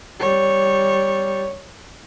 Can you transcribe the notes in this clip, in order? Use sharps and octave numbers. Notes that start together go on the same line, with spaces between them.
G3 C#5